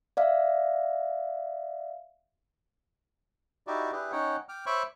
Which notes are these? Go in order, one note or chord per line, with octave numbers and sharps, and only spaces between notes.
D5 E5 F5
D#4 E4 F#4 G4 D5
D4 E4 G4 G#4 B4
C#4 D#4 C#5 F#5 G5
G5 D6 F6
C5 C#5 E5 B5 C#6 D6